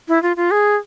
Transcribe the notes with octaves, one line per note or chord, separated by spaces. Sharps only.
E4
F4
F4
G#4